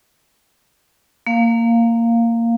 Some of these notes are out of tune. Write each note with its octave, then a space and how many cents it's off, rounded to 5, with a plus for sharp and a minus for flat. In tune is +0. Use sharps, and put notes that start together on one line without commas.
A#3 -15 F5 +0